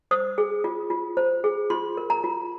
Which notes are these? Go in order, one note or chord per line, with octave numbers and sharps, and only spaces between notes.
C5 D#6
G#4
F4
F4
C5
G#4
F4 C6
A#4
A#5
F4